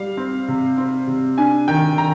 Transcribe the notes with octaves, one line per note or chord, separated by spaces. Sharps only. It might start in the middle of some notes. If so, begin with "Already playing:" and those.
Already playing: G3 F5
C4
C3
C4
C3
D4 G#5
D#3 G5
D#3 A#5